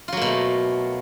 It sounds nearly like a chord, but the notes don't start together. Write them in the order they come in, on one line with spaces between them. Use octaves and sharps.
F4 F#3 A#3 B2 A3